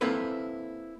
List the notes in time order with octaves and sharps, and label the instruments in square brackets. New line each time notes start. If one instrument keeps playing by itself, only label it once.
[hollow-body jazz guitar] A#3 C4 E4 A4 B4